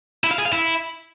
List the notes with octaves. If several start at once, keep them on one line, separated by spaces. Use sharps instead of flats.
E4
F5
G#4
F5
E4